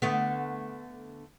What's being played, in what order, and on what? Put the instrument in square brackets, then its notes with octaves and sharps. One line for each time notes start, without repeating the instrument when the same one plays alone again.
[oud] D3 A3 B3